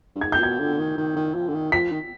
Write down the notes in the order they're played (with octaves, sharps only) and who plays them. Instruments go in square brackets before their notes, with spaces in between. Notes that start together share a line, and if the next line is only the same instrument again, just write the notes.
[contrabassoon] G2
[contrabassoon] G#2 [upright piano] G#6
[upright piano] G6
[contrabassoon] B2 [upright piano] G#6
[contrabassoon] D3
D#3
D#3
D#3
F3
D3
D#3
[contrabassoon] F3 [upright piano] B6
[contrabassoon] D#3